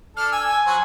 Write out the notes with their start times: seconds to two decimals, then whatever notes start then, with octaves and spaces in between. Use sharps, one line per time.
0.17 D4 A4 F6
0.32 G#5 E6
0.48 G#5
0.66 F#3 C5 F#5